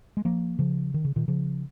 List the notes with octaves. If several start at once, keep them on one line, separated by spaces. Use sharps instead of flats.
G#3
F3 A#3
C#3 F3
D#3
C#3
A#2 D#3
C#3 F3